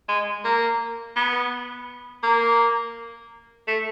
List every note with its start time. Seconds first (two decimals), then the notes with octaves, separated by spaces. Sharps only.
0.09 G#3
0.45 A#3
1.16 B3
2.23 A#3
3.67 A3